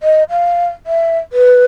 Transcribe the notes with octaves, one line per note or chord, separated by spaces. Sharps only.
D#5
F5
E5
B4